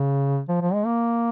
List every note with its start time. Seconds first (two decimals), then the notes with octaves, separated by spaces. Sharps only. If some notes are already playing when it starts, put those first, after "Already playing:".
Already playing: C#3
0.49 F3
0.62 F3
0.74 G#3
0.86 A#3